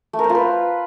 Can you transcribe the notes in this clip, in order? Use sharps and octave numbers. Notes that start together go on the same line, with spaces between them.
A3
A#4
C5
F4
B4